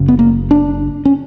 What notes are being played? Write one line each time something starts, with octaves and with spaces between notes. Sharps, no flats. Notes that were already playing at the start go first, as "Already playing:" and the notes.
Already playing: F#1 C#3
B3
A#3
D4
C#4